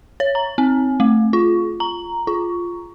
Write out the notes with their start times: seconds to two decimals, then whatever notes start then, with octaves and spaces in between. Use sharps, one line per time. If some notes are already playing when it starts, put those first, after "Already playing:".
0.20 C#5
0.35 A#5
0.58 C4
1.00 A3
1.33 F4
1.80 A#5
2.27 F4